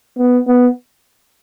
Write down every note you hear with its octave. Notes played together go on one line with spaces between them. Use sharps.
B3
B3